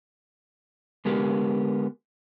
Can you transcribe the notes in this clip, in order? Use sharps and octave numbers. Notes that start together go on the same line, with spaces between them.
D3 G#3 B3 G4 A#4